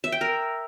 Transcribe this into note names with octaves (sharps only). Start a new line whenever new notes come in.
E5
G5
A#4